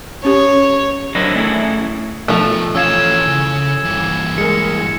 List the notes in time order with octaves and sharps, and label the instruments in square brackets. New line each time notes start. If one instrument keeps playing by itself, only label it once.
[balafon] C#4 G4 [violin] C#5
[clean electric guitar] F#3 C4 D4 E4 A#4 D#5
A3 C#4 E4 G#4
[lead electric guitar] B2 D#4 [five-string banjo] F3 A3 [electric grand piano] E6
[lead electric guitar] E3 C#5 [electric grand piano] C#4 A4 F5 [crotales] E6 G#6 E7
[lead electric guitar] C#3
G2 E3
[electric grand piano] G#3 G#4 A#4 [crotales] C#7